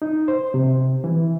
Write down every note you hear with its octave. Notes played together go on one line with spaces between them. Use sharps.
D#4
C5
C3
E3